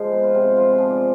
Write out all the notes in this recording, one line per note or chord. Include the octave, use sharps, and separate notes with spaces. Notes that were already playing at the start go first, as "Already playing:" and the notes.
Already playing: F3 G#3 C5
B3
F4
C3
B3 F4
G#4
F3
D5